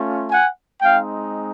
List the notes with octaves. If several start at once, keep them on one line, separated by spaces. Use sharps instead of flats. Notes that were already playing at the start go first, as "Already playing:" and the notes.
Already playing: A3 C#4 F4
F#5 G#5
G#3 C4 D#4 F5 G5